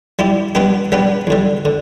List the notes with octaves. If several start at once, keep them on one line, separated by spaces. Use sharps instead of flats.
G3 E4 G4
G3 B3 D4 G4 B4
G3 B3 D4 G4 B4
E2 D3 G3
D3